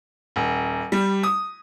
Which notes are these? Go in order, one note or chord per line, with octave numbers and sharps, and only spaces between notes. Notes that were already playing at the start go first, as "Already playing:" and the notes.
D#1
G3
D#6